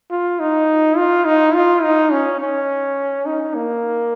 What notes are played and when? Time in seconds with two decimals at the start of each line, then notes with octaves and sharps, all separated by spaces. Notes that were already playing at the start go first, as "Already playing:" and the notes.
0.11 F4
0.40 D#4
0.97 F4
1.25 D#4
1.54 F4
1.83 D#4
2.12 C#4
2.40 C#4
3.26 D#4
3.55 A#3